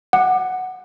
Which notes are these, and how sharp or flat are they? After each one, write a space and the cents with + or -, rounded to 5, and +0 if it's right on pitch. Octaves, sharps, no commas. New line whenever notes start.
F#5 +0 D6 +30